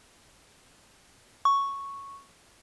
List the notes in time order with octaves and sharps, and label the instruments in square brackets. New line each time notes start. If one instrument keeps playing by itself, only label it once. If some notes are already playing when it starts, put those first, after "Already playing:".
[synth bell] C#6